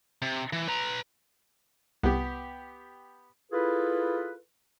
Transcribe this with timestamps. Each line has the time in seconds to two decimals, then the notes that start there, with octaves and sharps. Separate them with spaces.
0.22 C3
0.53 E3
0.68 B4 A#5
2.03 C2 B3 G4
3.52 E4 F4 G#4 A4 B4